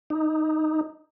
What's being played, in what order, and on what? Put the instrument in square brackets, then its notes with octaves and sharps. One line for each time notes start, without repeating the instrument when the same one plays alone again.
[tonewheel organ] D#4